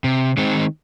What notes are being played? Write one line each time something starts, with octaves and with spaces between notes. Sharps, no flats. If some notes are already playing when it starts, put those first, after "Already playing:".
C3
D#3 G#3 C4 D#4